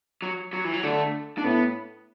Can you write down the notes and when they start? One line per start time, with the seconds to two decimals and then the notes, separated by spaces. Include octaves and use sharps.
0.22 F#3
0.53 F#3
0.64 E3
0.73 F#3
0.83 D3 A3
1.38 D4
1.44 A2 B3